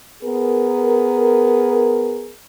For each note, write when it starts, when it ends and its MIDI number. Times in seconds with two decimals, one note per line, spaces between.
0.23 2.32 59
0.23 2.32 68
0.23 2.32 70